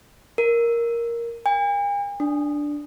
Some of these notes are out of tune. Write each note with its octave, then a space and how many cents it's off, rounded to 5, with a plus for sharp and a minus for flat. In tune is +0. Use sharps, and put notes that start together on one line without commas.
A#4 +5
G#5 -45
D4 +0